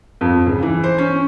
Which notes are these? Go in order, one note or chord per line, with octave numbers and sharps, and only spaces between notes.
F2
C#2
E3
C5
C#4